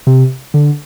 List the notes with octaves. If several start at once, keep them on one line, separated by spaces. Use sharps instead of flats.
C3
D3